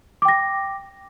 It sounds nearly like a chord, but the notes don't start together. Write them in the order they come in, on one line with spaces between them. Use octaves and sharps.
D6 G5 A#6